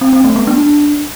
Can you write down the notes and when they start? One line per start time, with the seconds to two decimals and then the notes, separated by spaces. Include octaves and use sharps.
0.01 C4
0.13 C4
0.24 A3
0.36 B3
0.47 D4